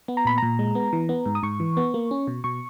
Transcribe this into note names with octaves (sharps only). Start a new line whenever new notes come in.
B3
A#5
A#2 B5
A#2 A#5
G#3
B3
E3
B3
G#2
D#6
G#2 C#6
E3
B3
A#3
C#4
B2
B2 C#6